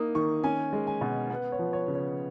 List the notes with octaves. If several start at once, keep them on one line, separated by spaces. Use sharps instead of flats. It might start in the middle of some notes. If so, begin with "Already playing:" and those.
Already playing: A#3 D#4 D#6
D#3 C#6
C#4 G#5
G#3
G#5
B2
B3 F#5
C#5
F3
C#5
C#3
C#5